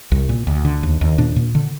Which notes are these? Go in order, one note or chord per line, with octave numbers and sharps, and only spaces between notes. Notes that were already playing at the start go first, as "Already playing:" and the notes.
C2
A#2
D2
D3
D#2
D#2
A#2 D4
A#2
D3